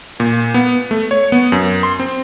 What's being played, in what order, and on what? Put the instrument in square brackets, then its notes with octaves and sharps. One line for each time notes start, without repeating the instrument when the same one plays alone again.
[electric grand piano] A#2
B3
A3
C#5
B3
F#2
C6
C4